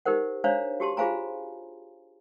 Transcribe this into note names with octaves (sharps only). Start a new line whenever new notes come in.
D#4 G4 A#4 C5 F#5
D4 C5 C#5 F5 A#5
F#4 G4 A5 C6
F4 G#4 C5 F5 G#5 A#5